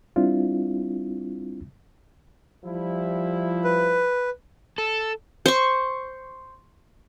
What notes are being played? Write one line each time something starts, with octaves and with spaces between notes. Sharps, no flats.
G3 C4 D4 E4 F4
F3 G3 E4
B4
A4
C5 C#6